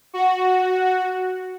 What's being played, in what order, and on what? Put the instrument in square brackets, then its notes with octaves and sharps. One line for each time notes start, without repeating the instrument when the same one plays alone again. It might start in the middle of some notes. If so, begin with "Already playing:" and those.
[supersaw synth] F#4